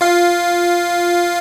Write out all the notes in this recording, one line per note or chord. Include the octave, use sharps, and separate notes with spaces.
F4 F5